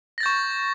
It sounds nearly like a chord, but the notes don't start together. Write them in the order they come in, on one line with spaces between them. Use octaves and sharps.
A#6 A6 G6 C#6